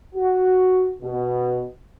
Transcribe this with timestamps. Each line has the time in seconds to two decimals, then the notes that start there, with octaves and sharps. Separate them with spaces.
0.15 F#4
1.02 B2